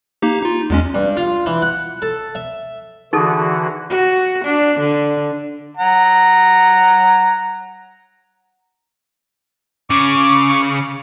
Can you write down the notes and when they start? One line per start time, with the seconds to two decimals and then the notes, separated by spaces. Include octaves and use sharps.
0.22 A#3 D#4 G4
0.43 D#4 F4
0.70 E2 G#3 C#4
0.94 G2
1.17 F4
1.46 E3
1.62 F#5
2.02 A4
2.35 E5
3.13 D3 E3 D#4 F#4 G#4 A4
3.89 F#4
4.44 D4
4.79 D3
5.77 F#5 A#5
9.90 C#3 C#6 D6